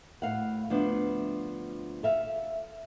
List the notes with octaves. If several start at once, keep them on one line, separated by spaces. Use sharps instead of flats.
A2 F5 F#5
D2 F3 B3 D4
A4 E5 F5